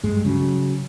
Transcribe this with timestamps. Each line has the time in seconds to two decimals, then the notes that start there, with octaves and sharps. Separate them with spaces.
0.04 G2 G#3
0.25 C#3 F#3